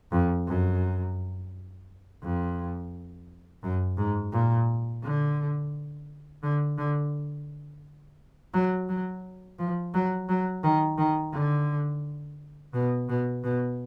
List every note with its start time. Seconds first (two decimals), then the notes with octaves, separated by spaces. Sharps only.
0.12 F2
0.48 F#2
2.23 F2
3.63 F#2
3.97 G#2
4.32 A#2
5.03 D3
6.43 D3
6.78 D3
8.54 F#3
8.89 F#3
9.59 F3
9.94 F#3
10.29 F#3
10.64 D#3
10.98 D#3
11.33 D3
12.74 B2
13.09 B2
13.44 B2